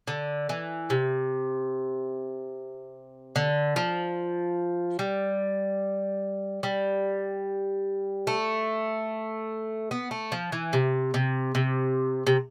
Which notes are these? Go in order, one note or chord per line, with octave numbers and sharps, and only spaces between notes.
D3
E3
C3
D3
F3
G3
G3
A3
B3
A3
F3
E3
C3
C3
C3
C3